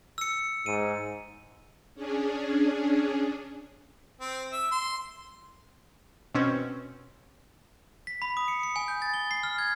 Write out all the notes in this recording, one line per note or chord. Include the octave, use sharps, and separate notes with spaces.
E6 C#7
G#2 D#7
C#4 D4 G#4
C4
E5
C6
B2 C4 C#4
B6
B5
D#6
C#7
C#7
G#5
G6
A6
G7
C7
F6
G#6